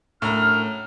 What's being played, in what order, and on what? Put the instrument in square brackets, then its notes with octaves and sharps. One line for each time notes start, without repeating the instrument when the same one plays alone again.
[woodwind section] F#2 D4 F6 [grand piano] A2 A#5